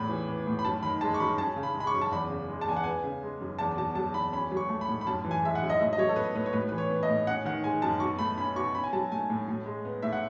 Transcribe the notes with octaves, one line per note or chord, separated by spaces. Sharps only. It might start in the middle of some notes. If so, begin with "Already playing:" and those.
Already playing: E2 A2 B5
E3
B3
A2
B5
F#2 A5
D#3 B5
G#3 A5
C#6
F#2 B5
C#4 A5
C#3
B5
G#3
B5
C#6
F#2
A5
E2 B5
C#3
G#3
A5
E2 G#5
F#5
B3 G#5
C#3
G#3
F#2
E2 A5
B2 A5
F#3 A5
E2 B5
C#4 B5
F#3
C#6
A3
B5
A2
B5
F#2 A5
E3
G#5
G#3 E5
F#5
F#2
D#5
A2 E5
D#5
F#3 C#5
A4
B3 B4
A2 B4
C#5
A2 B4
E3 B4
C#5
B3
D#5
A2
C#4 F#5
D#3 F#5
G#3 G#5
F#2 A5
B2 C#6
A3 B5
C#4 B5
B2 C#6
C#4 B5
G#5
F#3 A5
A3 G#5
A2
A2
G#3
B3
A2 E5
F#5